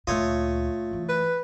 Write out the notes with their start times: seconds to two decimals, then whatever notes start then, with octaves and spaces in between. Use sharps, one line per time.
0.07 D2 A#2 A3 F4 C#5 D#5
0.91 F#2 E3
1.09 B4